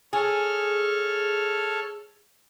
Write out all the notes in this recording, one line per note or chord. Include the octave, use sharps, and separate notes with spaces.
G#4 A4 C#5 F6